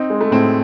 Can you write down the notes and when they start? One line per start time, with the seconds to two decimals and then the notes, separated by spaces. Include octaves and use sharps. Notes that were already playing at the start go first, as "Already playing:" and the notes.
Already playing: C4 D#4
0.10 G#3
0.21 A3
0.31 A2 C4